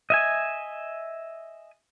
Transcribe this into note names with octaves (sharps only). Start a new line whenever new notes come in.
D#5 E5 G#5